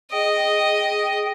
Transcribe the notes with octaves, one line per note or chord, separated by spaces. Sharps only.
G#4 D#5 G5